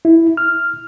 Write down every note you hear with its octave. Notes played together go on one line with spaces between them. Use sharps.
E4
F6